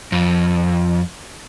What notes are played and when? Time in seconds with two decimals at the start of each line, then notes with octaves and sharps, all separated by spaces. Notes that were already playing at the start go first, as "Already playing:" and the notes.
0.12 F2